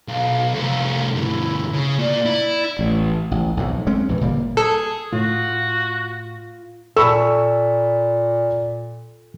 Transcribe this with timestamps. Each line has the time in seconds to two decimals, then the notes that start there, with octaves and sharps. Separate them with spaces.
0.09 B1 F5
0.54 C2 A3
1.16 D2 G2 E4
1.74 C#3
1.99 A#2 D5
2.26 E4
2.79 A1
3.31 A1
3.57 B1 F2 A2
3.87 G#3 C4 C#4
4.09 A#1 E2 G2 E3
4.21 F#1 A#2 G3 A#3
4.57 G#4 A4
5.13 A2 F4 F#4
6.97 A#2 A4 B5 C#6 E6